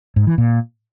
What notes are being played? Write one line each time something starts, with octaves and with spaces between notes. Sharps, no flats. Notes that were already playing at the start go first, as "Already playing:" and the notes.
G#2
E3
A#2